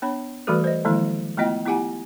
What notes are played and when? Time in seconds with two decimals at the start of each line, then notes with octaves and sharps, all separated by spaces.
0.02 B3 D4 C#5 B5
0.47 E3 G3 A3 F#4 A4 B4
0.64 C5 D#5
0.85 D#3 F3 G#3 A#3 E4
1.38 A3 B3 E4 F4 D#5 G5
1.66 B3 E4 F4 G4 F#5 G#5